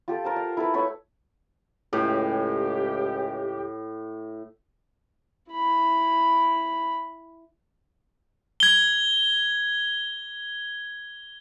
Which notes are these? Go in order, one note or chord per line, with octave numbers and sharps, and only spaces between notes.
F4 G4 A4
A#4 C5 A5
F5
E4 A4 B4
A3 A4 B4 C#5
C#2 A2 G4
E4 B5
G#6 G7